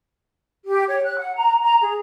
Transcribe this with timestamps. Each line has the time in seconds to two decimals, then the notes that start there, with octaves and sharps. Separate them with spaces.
0.66 G4
0.87 C#5
1.03 F#6
1.18 F#5
1.35 A#5
1.63 A#5
1.80 G#4